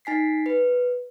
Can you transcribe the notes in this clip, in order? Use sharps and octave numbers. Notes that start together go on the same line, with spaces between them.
D#4 G#5 B6 C7
B4